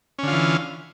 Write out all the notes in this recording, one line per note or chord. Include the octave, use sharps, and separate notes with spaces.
D3 E3 C#4 F4